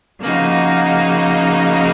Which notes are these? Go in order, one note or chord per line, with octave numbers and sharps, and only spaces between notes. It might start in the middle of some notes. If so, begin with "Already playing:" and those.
C#3 F3 A#3 D#4 F#4